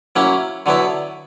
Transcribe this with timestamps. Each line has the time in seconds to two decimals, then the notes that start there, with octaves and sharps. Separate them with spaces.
0.16 F#3 A#3 C#4 E4
0.66 D3 F#3 B3 E4